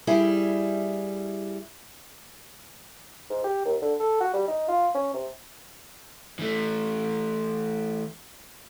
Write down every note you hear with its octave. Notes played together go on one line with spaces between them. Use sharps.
G3 E4 G#4
G#2
G4
D#2
D3
A4
F#4
G3
D#4
F4
C#4
C3
E3 A3